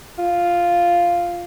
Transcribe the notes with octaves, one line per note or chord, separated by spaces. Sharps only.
F4